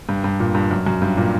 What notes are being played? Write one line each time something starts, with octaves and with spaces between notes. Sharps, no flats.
G2
G2
A#2
G2
F#2
F#2
G2
A#2